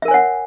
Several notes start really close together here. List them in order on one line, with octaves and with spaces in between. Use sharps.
E5 A#4 G#5 C#5 F#5